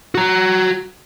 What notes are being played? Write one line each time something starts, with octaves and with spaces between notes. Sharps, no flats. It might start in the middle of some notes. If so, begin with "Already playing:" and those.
F#4 A#5